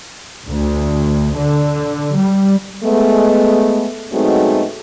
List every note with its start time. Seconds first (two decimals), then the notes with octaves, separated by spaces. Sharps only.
0.47 D2
1.38 D3
2.15 G3
2.84 G#3 A3 B3
4.13 B2 F#3 G#3 A3 C4 D#4